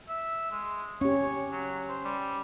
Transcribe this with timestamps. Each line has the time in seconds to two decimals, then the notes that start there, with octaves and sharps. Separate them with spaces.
0.09 E5
0.51 G#3
1.01 C#4 G4 C#5
1.52 F#3
1.89 C5
2.05 G3